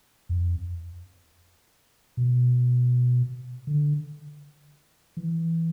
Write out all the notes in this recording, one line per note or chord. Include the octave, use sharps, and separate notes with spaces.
F2
B2
D3
E3